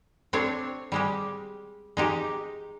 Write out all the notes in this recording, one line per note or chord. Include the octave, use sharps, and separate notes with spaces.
C4 D4 C#5 A5
G3 G#3 G4
G#3 D#4 G4